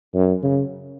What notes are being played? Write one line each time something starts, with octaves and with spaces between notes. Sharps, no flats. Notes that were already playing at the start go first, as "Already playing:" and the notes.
F#2
C#3